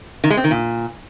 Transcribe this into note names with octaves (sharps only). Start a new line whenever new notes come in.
D#3
G#3
C4
D#3
A#2